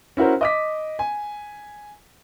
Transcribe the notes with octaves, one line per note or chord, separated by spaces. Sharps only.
C#4 E4 F#4 A#4 C5
D#5 D6 B6
G#5